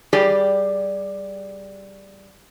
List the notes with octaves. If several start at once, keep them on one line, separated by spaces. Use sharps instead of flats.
G3 G4 G#4 D5